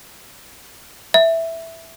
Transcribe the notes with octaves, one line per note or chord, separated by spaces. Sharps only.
E5